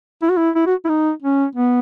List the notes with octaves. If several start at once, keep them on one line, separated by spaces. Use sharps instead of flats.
E4
F#4
E4
E4
F#4
E4
D#4
C#4
B3